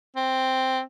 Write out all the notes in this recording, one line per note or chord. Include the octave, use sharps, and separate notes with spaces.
C4